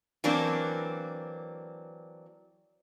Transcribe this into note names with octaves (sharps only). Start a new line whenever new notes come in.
E3 F#3 A#3 C4 D4